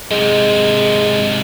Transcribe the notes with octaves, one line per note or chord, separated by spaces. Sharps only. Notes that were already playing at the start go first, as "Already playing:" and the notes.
G#2 C3 G#3